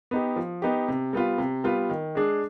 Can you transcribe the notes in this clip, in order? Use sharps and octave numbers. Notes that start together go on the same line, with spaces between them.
B3 D#4 G4
F3
B3 D#4 G4
C3
G3 B3 F4
C3
G3 B3 F4
D#3
G#3 D4 G#4